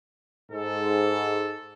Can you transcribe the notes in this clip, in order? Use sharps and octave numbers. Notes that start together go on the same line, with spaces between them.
G#2 A4